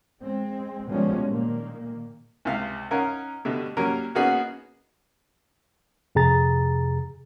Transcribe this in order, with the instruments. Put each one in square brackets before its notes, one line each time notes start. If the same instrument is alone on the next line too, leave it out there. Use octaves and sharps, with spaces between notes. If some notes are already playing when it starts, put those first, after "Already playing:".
[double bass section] G#3 C4
B2 D#3 F3 G3 G#3 C#4
A#2 D#3 A#3
[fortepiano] C#2 C3 F5 F6
C#4 D#4 A#4 F5 F#5
B2 D3 G3 A3
F#3 G3 A#3 C#4 A#4
A#3 B3 C#4 D#4 F#4 G#4
[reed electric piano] F2 C3 G#4 A#5 A6